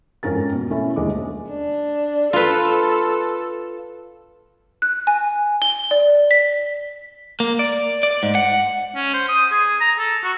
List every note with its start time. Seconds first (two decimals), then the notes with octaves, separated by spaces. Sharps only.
0.23 F2 G#2 C#4 A#4 A6
0.53 B2
0.70 A3 C#4 E4
0.96 D#1 D3 G#3 D#5 D6
1.50 D4
2.33 F4 A4 B4
4.82 F#6
5.07 G#5
5.62 G7
5.91 D5
6.31 B6
7.40 A#3
7.59 D5
8.03 D5
8.23 G#2
8.35 F#5
8.95 C#4
9.14 C5
9.29 D#6
9.52 G#4
9.81 A#5
9.99 A4
10.24 F#4